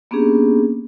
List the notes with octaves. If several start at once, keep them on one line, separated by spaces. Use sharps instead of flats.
A#3 B3 C#4 D4 G4 G#4